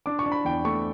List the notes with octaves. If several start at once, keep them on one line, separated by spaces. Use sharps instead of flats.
D4 D6
C#6
D4
B5
E2 G5
A3 C#6